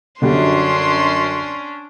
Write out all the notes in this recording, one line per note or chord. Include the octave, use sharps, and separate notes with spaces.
F#2 D3 G3 C#4 D4 C6